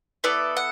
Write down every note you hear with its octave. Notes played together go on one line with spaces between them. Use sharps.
B3 E4 A4 D5
F#5